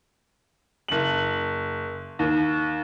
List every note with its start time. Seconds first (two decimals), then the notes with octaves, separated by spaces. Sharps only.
0.88 F#1 F#7
2.19 D#2